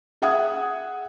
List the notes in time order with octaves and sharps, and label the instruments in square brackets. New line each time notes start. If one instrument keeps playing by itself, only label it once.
[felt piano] G#4 E5 F#5 D#6 G#6